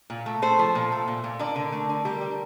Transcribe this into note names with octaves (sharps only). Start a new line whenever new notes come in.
A#2
A3
A3 A4 C5
F3
A#2
A3
A#2
A#2
D3 A#4 D5
D3
A3
D3
G3 G4 A#4
G3